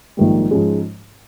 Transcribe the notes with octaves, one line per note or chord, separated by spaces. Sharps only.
A#1 G#2 D#3 G3
G#2 F3 G#3 C#4